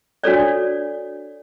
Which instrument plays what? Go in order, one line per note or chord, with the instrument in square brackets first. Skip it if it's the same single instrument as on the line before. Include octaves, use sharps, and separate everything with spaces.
[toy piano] D4 F#4 A4 C#5 D5